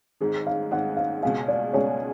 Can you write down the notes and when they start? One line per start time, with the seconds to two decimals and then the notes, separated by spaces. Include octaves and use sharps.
0.21 G#1 G#2 G#3 G#4
0.47 F5
0.71 G#1 G#2 G#3 F#5
0.97 F5
1.23 C#2 B2 G#3 C#4 G#4 F5
1.48 D5
1.73 C#2 B2 G#3 C#4 G#4 C#5